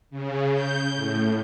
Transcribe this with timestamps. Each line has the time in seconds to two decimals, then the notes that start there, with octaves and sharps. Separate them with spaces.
0.11 C#3
0.54 G6
0.95 A2